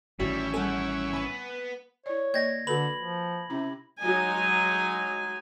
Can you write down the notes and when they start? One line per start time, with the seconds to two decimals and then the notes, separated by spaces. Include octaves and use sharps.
0.20 A1 A2 D#3 G3 C#4 E4 F#4
0.54 G3 G#4 A4 F#5 G#5
1.13 B3 B4 G#5 C#6
2.06 E4 C#5 D5
2.34 A#3 D5 D#5 G#6 A#6
2.67 D3 F#4 A4 B4 B5 F#7
2.97 F3
3.50 C3 C#4 E4
4.01 F#3 G#3 D#4 G#5